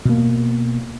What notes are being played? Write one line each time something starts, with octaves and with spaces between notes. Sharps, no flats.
B2 A#3